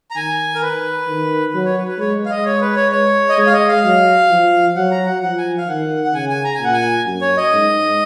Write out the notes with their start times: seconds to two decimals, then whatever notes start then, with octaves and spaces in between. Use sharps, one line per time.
0.11 A#5
0.16 D#3 G#5
0.55 A#4
0.62 B4
1.08 D#3
1.53 F#3 B4
1.65 C#5
1.77 B4
1.88 B4
1.99 G#3 C#5
2.26 F5
2.31 D#5
2.46 C#5
2.61 B4
2.76 C#5
2.92 C#5
3.29 D#5
3.38 G#3 C#5
3.47 F5
3.53 D#5
3.68 F5
3.84 F#3
4.30 F3
4.76 F#3 F#5
4.91 A#5
5.06 F#5
5.21 F3 F#5
5.38 G#5
5.58 F5
5.68 D#3 F#5
6.04 F#5
6.14 C#3 G#5
6.29 G#5
6.45 A#5
6.55 G#5
6.60 A#2 F#5
6.73 G#5
7.06 F#2
7.21 C#5
7.37 D#5
7.53 G#2